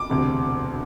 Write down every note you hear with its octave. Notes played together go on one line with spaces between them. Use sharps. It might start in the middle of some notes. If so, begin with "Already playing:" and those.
Already playing: D6
E1 D2 C3